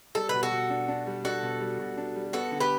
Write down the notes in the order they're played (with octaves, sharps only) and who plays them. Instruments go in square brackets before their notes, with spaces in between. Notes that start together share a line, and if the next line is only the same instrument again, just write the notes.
[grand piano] G3 [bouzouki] A4
[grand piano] B2 [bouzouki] B4
[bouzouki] F#4 A4
[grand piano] B2
D4
D4
G3
[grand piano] D4 [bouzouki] F#4 A4
[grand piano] B2
G3
B2
D4
G3
[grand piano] B3 [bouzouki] F#4 A4
[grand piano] D3
[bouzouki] G4 B4